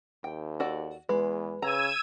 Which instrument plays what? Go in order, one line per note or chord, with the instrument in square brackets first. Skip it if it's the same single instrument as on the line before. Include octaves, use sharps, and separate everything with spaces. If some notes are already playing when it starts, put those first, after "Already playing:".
[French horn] D#2 [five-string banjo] G5
[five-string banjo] F#4 A4 D5
[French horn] E2 [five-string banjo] G#3 [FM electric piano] B4
[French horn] C#3 [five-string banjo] A#5 [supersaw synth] E6 G#6 D#7